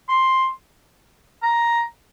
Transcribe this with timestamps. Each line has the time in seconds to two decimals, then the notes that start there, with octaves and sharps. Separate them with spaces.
0.09 C6
1.43 A#5